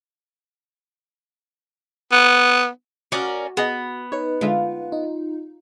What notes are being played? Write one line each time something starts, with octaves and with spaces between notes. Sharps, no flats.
B3
C#4 F#4 A#4 D5 D6 D#6 F#6
B3 G#4 D#5
D#4 B4 C#5
D3 G#3 F4 E5
D#4